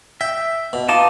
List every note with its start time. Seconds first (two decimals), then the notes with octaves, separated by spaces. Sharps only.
0.21 E5 G5
0.73 B2
0.89 D#4 F4 A5 D6